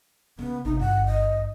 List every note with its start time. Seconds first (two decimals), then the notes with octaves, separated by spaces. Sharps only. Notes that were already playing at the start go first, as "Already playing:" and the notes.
0.39 C#3 B3
0.65 G#1 C3 D#4
0.79 G1 F#5
1.06 D#5